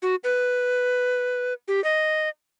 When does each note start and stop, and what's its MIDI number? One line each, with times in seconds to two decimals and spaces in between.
0.02 0.15 66
0.24 1.53 71
1.68 1.83 67
1.84 2.29 75